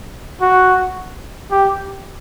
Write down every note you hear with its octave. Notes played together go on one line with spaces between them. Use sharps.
F#4
G4